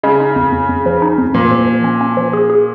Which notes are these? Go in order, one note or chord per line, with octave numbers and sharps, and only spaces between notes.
C#3 G#3
D#4
F2
F2
F2
F3
D#4
F2
A#2 F3
F3
F3
C#4
C#4
F3
G#4
G#4